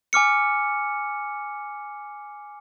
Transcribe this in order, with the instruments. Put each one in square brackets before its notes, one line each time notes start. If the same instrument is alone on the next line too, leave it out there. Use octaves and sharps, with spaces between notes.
[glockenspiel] G#5 D6 F6 C#7